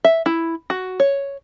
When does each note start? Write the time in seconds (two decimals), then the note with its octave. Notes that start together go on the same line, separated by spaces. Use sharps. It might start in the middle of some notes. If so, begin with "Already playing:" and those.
0.04 E5
0.26 E4
0.70 F#4
1.00 C#5